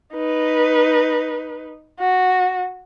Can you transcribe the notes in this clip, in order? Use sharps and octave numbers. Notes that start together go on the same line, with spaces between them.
D#4 B4
F#4